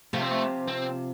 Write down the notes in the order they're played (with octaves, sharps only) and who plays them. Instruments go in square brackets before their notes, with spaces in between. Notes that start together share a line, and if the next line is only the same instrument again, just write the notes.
[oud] C3 F3 [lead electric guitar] A3
[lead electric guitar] C4
A3
C4